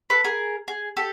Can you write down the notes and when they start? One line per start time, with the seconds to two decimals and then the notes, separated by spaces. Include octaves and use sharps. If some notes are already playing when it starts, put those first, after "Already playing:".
0.10 A4 B4
0.24 G#4 A#4
0.68 G#4
0.97 G4 A4